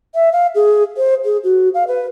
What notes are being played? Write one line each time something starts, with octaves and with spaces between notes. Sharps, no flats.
E5
F5
G#4
C5
G#4
F#4
F5
B4